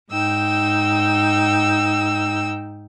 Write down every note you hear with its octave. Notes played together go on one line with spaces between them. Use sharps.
G#2 D#4 G5 E6